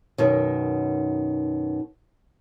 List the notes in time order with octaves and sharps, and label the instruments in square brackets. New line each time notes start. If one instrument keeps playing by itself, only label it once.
[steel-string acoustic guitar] F#2 B2 D#3